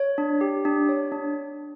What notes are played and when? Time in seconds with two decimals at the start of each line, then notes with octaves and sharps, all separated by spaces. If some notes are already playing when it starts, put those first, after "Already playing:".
Already playing: C#5
0.18 D4
0.41 G4
0.65 D4
0.89 C#5
1.12 D4